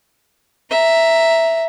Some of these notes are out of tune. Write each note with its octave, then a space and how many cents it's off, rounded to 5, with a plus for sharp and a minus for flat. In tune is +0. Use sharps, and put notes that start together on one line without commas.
E5 +0 A#5 +0